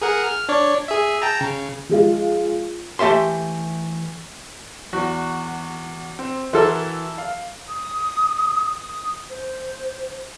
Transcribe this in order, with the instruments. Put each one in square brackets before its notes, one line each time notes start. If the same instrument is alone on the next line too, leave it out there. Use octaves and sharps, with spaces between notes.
[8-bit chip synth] G#4 A#4 F#5
F6
D4 C#5 D5
G#4 E5
G5 A5 A#5
C#3
[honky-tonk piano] F3 G#3 F4
[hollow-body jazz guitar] E3 A3 G4 E5 C6
[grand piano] E2 [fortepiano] F#4
[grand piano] C4
[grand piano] E3 F#4 C6 [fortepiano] E4 A4 A#4
[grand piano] F5
[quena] D#6
D#6
C5